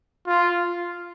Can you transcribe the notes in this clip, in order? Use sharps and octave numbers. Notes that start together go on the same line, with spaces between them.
F4